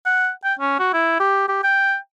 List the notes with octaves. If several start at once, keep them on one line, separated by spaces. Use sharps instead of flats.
F#5
G5
C#4
F#4
E4
G4
G4
G5